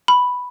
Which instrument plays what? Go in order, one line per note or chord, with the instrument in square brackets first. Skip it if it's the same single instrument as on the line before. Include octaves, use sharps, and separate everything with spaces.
[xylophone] B5